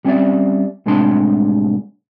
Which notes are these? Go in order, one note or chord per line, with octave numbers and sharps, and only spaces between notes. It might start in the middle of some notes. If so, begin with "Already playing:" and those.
G3 C4 C#4 A4 D5 E5
C2 A2 C3 G#3 D4 C6